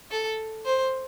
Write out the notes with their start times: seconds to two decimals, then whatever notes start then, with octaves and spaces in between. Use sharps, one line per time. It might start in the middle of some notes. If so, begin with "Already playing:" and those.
0.11 A4
0.65 C5